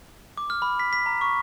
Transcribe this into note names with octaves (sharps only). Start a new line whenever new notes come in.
D6
F6
B5
B6
B6
A#5
C#6